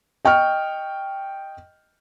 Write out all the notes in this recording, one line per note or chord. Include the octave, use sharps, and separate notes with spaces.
D#5 G5 C#6 F6